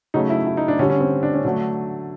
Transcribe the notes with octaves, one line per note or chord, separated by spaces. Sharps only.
C#3 F#3 A3 D#4
E4
E4
D#4
D4
D3 G3 C#4
C#4
C4
D4
C#4
D3 F#3 A3 D4